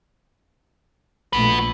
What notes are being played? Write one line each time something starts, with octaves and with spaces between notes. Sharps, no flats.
A#1 A3 F#4 B4